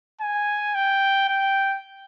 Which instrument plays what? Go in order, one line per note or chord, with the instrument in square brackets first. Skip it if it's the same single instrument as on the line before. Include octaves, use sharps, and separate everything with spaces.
[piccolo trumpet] G#5
G5
G5